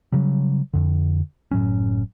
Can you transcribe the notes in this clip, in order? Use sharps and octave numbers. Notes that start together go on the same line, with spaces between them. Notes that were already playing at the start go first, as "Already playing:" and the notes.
C#3 F#3 G3
F2 D3
F#1 A2 F#3 C#4